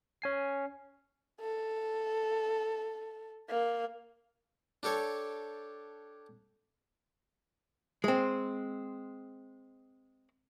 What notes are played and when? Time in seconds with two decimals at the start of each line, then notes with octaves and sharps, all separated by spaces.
0.22 C#4 G#5 C7
1.41 A4
3.50 A#3
4.83 D4 G4 A4 C#5
8.04 G#3 C4